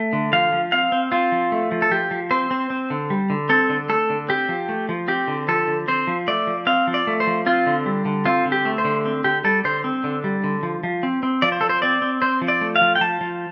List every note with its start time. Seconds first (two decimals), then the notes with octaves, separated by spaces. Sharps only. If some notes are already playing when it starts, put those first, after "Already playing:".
Already playing: A3
0.13 D3
0.33 F3 F5
0.52 F3
0.72 C4 F5
0.92 C4
1.12 C4 F4
1.32 F3
1.52 A3
1.72 F3
1.82 A4
1.91 F3 G4
2.11 F3
2.31 C4 C5
2.51 C4
2.70 C4
2.90 D3
3.10 G3
3.30 D3
3.49 C4 A4
3.69 D3
3.89 A3 A4
4.10 D3
4.29 C4 G4
4.49 F3
4.69 A3
4.89 F3
5.08 C4 G4
5.28 D3
5.48 F3 A4
5.67 D3
5.88 C4 C5
6.07 F3
6.28 A3 D5
6.47 F3
6.67 C4 F5
6.87 F3
6.94 D5
7.07 A3
7.20 C5
7.27 F3
7.46 C4 F4
7.66 D3
7.86 G3
8.05 D3
8.26 C4 F4
8.45 D3
8.52 G4
8.65 A3
8.78 C5
8.85 D3
9.06 C4
9.24 D3 G4
9.44 G3 A4
9.64 D3 C5
9.84 C4
10.04 D3
10.24 G3
10.44 D3
10.63 F3
10.83 F3
11.03 C4
11.23 C4
11.42 F3 D5
11.52 C5
11.61 F3 A4
11.69 C5
11.82 C4 D5
12.02 C4
12.22 C4 C5
12.42 F3
12.48 D5
12.61 A3
12.76 F5
12.82 F3
12.95 G5
13.01 F3 A5
13.21 F3